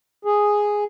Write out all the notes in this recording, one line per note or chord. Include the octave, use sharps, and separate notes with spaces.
G#4